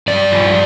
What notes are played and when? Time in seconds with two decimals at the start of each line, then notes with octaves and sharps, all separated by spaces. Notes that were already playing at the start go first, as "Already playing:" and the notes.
0.08 G2 D5
0.32 F3